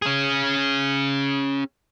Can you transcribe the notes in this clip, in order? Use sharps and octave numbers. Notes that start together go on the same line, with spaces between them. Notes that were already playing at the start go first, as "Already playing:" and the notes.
C#4 G#4